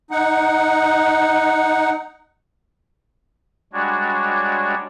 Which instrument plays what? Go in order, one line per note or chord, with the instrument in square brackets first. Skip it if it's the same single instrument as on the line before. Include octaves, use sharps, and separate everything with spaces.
[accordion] D#4 F#5
[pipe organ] G3 G#3 D4 F#4 C#5